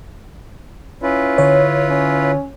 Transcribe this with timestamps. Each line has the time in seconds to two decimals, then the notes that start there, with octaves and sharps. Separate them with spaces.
1.02 C#4 E4 F4 B4
1.38 D3 C#5
1.89 C#4